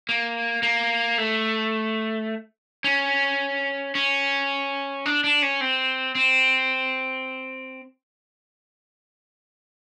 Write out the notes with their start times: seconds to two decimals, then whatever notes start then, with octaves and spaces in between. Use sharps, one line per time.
0.09 A#3
0.63 A#3
1.18 A3
2.84 C#4
3.95 C#4
5.06 D4
5.24 D4
5.42 C#4
5.61 C4
6.15 C4